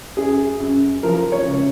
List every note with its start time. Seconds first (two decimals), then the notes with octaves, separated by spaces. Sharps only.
0.17 F#2 G#4
0.60 F#2
1.03 F3 A#4
1.32 C#5
1.47 C#2